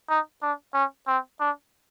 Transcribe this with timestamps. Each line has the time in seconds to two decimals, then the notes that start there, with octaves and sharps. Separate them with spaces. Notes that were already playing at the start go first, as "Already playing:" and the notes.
0.09 D#4
0.42 D4
0.74 C#4
1.07 C4
1.40 D4